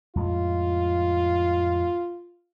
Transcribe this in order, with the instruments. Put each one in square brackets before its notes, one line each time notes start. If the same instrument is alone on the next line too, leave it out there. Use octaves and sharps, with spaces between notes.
[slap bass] F2 A2 G#3 [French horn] F4